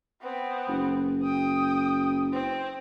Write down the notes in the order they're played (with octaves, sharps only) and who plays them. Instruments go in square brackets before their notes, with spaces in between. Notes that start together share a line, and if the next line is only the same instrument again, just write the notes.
[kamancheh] B3 C4
[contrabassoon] F#1
[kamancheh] G5 D#6
C4